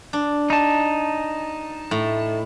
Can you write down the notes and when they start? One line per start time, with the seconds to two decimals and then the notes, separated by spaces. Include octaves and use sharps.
0.13 D4
0.50 D#4 A5
1.91 A2